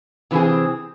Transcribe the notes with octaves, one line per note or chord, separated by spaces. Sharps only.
C3 E3 C4 E4 G#4